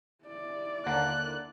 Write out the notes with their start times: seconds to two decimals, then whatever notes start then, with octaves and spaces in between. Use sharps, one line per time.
0.25 E4 D5
0.86 D#2 D3 A#3 F#6